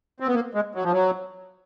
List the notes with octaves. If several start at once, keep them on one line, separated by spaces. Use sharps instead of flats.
C4
B3
A#3
G#3
F#3
F3
F#3